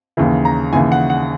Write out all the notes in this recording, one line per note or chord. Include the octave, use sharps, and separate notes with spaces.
D#2 C#3 E3
A#5
D#2 C#3 E3 G#5
F#5
F#5